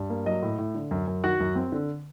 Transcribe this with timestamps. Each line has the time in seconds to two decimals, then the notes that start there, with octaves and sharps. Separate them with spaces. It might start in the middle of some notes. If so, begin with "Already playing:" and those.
Already playing: G2
0.10 A#3
0.26 F#3 D#5
0.43 A2
0.59 A2
0.75 D3
0.91 F#2
1.07 F#2
1.24 D#3 F#4 F#5
1.40 F#2
1.56 C4
1.72 D3